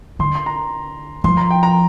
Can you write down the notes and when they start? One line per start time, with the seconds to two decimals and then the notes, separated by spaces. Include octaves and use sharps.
0.19 D3 C6
0.35 C6
0.46 A#5
1.24 F3 C6
1.37 A#5
1.51 G5
1.63 A#5